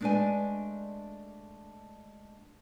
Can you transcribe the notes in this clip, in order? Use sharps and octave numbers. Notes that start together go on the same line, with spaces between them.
G#3 A3 D4 B4 D5 G#5